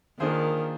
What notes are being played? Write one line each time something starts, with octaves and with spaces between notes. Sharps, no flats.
D#3 A#3 D4 F4 G#4 C5